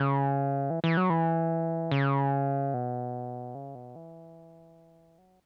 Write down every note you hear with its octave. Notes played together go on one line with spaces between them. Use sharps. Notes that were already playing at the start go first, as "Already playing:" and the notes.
Already playing: C#3
E3
E3
F#3
E3
C#3
B2
C#3
B2
E3
F#3